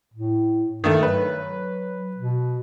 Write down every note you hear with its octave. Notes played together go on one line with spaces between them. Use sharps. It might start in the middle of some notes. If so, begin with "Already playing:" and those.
A2
G2 D#3 A3
F#3 B4
B2